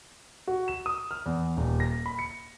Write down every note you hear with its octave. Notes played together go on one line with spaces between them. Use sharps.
F#4
E7
D#6
F6
E2
D#1
A#6
B5
C#7